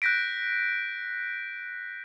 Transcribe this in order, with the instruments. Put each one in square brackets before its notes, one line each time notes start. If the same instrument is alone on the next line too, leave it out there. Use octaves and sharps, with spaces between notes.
[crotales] F#6 G6 A#6 B6 D7